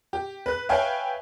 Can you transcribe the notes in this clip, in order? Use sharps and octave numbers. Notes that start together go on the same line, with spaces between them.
G4
B4 F#6
B4 C#5 E5 F5 G5 G#5